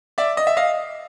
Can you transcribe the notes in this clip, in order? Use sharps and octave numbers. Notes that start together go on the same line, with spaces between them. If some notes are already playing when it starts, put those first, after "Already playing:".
D5 E5
D#5
E5
D#5 F5